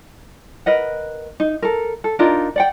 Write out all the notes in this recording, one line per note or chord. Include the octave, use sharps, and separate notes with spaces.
A#4 B4 D#5 F#5
D#4
A4 A#4
A4
D4 D#4 F4 A#4
D5 F#5 G5